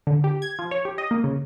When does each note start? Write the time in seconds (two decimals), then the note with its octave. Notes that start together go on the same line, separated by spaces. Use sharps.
0.07 D3
0.24 G4
0.42 G#6
0.59 F3
0.71 C#5
0.85 G4
0.98 D#5
1.11 A#3
1.24 C#3